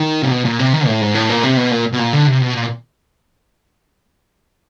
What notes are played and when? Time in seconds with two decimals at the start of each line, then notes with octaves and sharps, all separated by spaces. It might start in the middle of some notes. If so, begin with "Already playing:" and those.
Already playing: D#3
0.22 C3
0.31 B2
0.45 A#2
0.59 C3
0.73 D#3
0.87 A2
1.01 G#2
1.14 A2
1.29 A#2
1.43 C3
1.57 B2
1.71 A#2
1.93 B2
1.99 A#2
2.13 D3
2.27 C3
2.41 B2
2.55 A#2